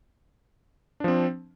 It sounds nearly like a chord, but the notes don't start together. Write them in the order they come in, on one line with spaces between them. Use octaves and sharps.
D4 F3 C4